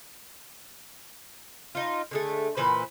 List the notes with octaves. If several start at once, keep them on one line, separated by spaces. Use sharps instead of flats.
D#4 F4
D3 G#3 A3
A#2 E3 B4 C5